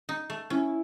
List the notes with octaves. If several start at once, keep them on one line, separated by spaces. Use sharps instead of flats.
D#4
A3
C#4 E4